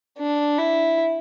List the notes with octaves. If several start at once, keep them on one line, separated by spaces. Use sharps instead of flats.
D4
E4